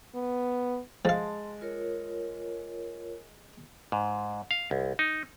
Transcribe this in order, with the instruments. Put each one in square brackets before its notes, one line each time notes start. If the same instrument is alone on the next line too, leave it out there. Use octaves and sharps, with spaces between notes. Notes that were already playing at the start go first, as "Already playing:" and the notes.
[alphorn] B3
[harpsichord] F3 F5 [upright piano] G#3 A6 [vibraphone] A5 C6
[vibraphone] F4 A#4 C#5
[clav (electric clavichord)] G#2
F5
C2
D#4